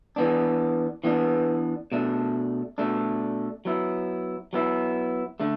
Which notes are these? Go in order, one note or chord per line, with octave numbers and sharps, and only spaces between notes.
E3 B3 D4
E3 B3 D4
B2 A3 D4
B2 A3 D4
F#3 B3 E4
F#3 B3 E4
D3 A3 D4